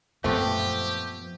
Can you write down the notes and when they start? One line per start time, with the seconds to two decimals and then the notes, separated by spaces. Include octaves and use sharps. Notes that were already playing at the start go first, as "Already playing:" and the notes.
0.24 F#2 A#2 F3 A3 B3 C4 G4